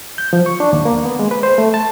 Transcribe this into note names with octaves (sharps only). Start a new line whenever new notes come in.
G6
F3
C#6
D4
D#2
A#3
B3
G#3
B4
C5
A3
A5